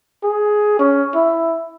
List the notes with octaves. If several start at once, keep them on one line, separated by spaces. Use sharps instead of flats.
G#4
C#4
E4